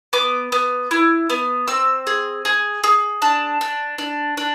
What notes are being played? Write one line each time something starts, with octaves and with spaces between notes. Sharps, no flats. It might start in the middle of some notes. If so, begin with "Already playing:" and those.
B3 D6
B3
E4
B3
C4 E6
G#4
G#4
G#4
D4 A5
D4
D4
D4